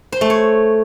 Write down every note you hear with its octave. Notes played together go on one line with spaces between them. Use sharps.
C5
A3
C#5